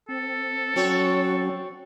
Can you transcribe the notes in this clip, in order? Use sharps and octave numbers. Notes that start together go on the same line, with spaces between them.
C4 A4
F#3 C4 C#4 F#4 C#5